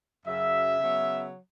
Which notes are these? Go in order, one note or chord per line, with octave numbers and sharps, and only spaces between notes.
F#2 C#3 F#3 E5
C#3 F#3 B3